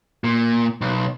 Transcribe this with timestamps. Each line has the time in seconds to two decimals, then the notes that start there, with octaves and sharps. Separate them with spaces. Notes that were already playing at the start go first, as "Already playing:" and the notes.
0.24 A#2
0.81 B1